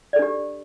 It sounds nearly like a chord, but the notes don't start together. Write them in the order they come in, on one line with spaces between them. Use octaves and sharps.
D5 A4 D4 G4